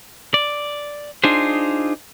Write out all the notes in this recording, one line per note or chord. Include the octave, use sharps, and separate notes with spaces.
D5
D4 D#4 F4 G#4 C5